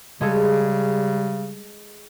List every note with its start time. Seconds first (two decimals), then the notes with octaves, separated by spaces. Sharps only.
0.21 C#3 G3 G#3 G#4 A4